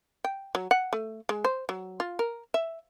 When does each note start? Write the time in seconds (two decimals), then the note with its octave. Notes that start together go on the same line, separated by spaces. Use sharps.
0.24 G5
0.55 F#3
0.71 F#5
0.93 A3
1.29 G#3
1.44 C5
1.69 F#3
2.00 F4
2.19 A#4
2.54 E5